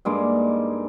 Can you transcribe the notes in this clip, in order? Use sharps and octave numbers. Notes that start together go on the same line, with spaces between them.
G2 G#3 A#3 D#4